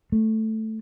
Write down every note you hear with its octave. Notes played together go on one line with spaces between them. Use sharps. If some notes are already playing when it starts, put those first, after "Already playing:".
A3